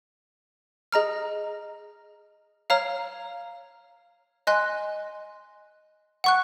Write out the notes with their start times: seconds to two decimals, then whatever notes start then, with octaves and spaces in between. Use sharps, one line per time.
0.92 G#4 D#5 A#5 F6
2.70 C#5 F5 A#5 F6
4.47 D#5 G#5 C6 F#6
6.24 F#5 C#6 F#6